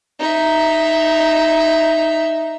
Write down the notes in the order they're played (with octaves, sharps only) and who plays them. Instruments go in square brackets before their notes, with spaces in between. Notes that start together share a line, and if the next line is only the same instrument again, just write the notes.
[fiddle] D#4 E5